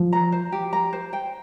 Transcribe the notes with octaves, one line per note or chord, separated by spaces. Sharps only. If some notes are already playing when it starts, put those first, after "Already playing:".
Already playing: F3
A#5
C5
G4
A#5
C5
G5